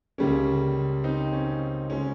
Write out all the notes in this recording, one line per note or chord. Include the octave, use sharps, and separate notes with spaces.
C#2 C#3 G3 A#3 C#4
C4 D#4
C#4
C#3 G#3 C#4